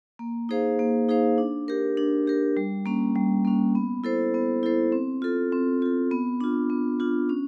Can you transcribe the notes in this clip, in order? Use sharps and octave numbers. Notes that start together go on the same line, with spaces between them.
A#3
D#4 G#4 C5 F5
A#3
D#4 G#4 C5 F5
D4
G4 A#4
D4
G4 A#4
G3
A#3 C#4
G3
A#3 C#4
B3
E4 A4 C5
B3
E4 A4 C5
C4
F4 A4
C4
F4 A4
B3
D4 F4
B3
D4 F4
C#4